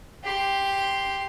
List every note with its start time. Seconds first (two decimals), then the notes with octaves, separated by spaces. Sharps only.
0.24 G4 C6